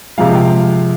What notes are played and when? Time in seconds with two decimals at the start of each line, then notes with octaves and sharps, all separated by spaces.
0.18 C3 F3 G#3 F5
0.35 G5